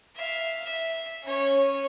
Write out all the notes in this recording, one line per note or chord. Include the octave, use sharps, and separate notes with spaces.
E5 F5
E5
C#4 C#5